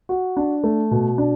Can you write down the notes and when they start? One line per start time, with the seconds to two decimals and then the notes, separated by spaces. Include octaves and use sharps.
0.09 F#4
0.37 D4
0.63 A3
0.91 B2
1.18 D4